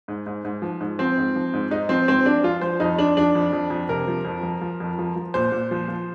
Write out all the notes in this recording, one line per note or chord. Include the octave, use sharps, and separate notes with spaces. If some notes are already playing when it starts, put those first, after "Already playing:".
G#2
G#2
G#2
F3
G#2
F3 C4
G#2
F3
G#2
G#2 D#4
F3 C4
G#2 C4
F3 D4
F3 F4
F3 C5
F2 D#4
F2 D4
F3 D4
F2
F2
F2
C3 A#4
F3
F2
F3
F3
F2
F3
F3
A#2 C5
A#2
F3
F3